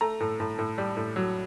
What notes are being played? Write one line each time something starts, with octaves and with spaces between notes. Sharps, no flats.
A3 A#5
A2
A2
A2
G3
A2
F#3